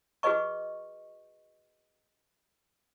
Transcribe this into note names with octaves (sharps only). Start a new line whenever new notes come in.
F#4 G#4 B4 D#5 C#6